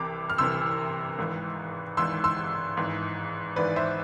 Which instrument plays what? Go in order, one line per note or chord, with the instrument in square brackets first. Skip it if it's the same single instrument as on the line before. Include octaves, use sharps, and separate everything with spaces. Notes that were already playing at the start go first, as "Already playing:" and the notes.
Already playing: [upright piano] C2 C3 E3 D6
F6
C2 C3 E3 C6 E6
G#1 G#2 E3
G#1 G#2 E3 C6 E6
C6 E6
G#1 G#2 E3
G#1 G#2 E3 B4 D5
C5 E5